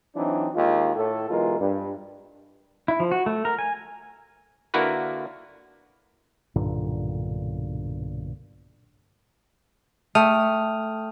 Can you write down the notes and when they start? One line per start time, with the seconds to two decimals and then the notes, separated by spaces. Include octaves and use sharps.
0.16 E3 F#3 C4 D4 D#4
0.55 D#2 G#3 A#3 F4
0.96 A2 A4
1.30 B1 E3 G#3 F4 A#4
1.60 G2
2.88 E4
3.00 F3
3.12 F#4
3.26 A3
3.45 A#4
3.59 G#5
4.74 D3 A#3 E4 F#4 A#4 B4
6.56 B1 G2 A#2 D3
10.15 A3 G5 D#6 F6